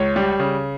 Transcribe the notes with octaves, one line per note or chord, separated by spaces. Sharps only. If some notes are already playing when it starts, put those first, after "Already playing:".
Already playing: C#2 C#5
G3
C#3